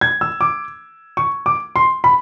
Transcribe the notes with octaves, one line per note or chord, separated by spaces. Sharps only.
G#6
E6
D6
C#6
D6
C6
B5